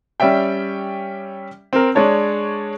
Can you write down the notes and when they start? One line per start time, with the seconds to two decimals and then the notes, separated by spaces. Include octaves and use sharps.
0.20 G3 C#4 D5 E5 G5
1.73 C4 A#4
1.95 G#3 D4 C#5 A5